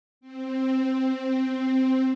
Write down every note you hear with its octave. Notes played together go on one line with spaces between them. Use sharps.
C4